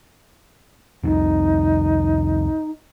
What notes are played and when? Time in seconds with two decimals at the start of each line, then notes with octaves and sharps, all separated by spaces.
1.04 C2 F2 C3 D#4